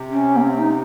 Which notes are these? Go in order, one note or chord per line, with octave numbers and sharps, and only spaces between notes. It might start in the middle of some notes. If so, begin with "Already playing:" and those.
Already playing: C3
C#4
A#3
C4
D#4